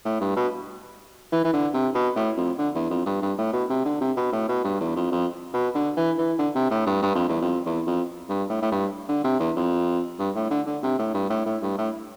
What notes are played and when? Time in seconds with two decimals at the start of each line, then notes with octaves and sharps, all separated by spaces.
0.05 A2
0.21 G2
0.36 B2
1.32 E3
1.44 E3
1.53 D3
1.74 C3
1.95 B2
2.16 A2
2.37 F2
2.58 D3
2.75 E2
2.90 F2
3.06 G2
3.22 G2
3.38 A2
3.53 B2
3.69 C3
3.85 D3
4.01 C3
4.17 B2
4.32 A2
4.48 B2
4.64 G2
4.80 E2
4.96 F2
5.12 F2
5.54 B2
5.75 D3
5.97 E3
6.18 E3
6.39 D3
6.55 C3
6.70 A2
6.86 G2
7.02 G2
7.15 F2
7.29 E2
7.42 F2
7.66 E2
7.87 F2
8.29 G2
8.50 A2
8.62 A2
8.71 G2
9.08 D3
9.24 C3
9.40 E2
9.56 F2
10.19 G2
10.35 A2
10.50 D3
10.67 D3
10.83 C3
10.99 A2
11.14 G2
11.30 A2
11.46 A2
11.62 G2
11.78 A2